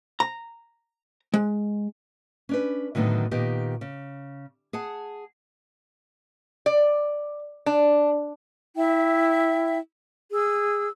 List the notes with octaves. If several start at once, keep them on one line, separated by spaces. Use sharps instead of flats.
A#5
G#3
C#4 D4 B4
A2 D3 D#3 F#3 B3 D4
A#2 D#3 B3 G4
C#3
G#4 F#5 A5
D5
D4
E4 E5 G5
G#4 E6